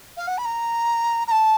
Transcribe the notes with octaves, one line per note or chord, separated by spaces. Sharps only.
F5
F#5
B5
A#5
A#5
A5